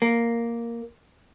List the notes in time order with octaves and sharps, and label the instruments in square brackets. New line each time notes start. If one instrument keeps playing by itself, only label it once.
[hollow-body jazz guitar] A#3